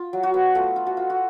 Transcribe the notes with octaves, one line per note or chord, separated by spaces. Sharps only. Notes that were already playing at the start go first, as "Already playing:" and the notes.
Already playing: F4
F#3
F#4
B3
A3 F4
F4
F#4
F4
F#4